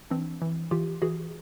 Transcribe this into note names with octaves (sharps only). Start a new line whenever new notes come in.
E3 C4 D4
E3
E3 F4 G4
E3 F#4 G#4